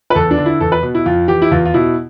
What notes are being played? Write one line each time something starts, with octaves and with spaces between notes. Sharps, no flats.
B4
E2 A4
D4
D3
E4
E2 A4
B4
B2
E4
F2 F4
E3 G4
E4
E2 F4
F4
B2 E4